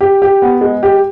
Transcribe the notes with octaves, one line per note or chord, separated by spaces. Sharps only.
G4
G4
B3
G#3
G4